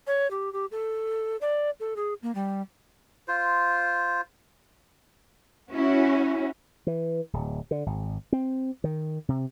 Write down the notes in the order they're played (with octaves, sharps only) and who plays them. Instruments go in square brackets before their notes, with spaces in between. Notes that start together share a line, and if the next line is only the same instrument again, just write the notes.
[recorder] C#5
G4
G4
A4
D5
A4
G#4
A#3
G3
[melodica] F4 C5
[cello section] C#4 E4 F#4
[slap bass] E3
D1
D3
G#1
C4
D#3
C3